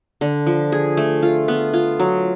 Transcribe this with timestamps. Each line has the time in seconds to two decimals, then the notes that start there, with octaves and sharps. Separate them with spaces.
0.21 D3
0.47 F3
0.72 G#4
0.97 A3
1.23 F4
1.48 B3
1.73 F4
2.00 F#3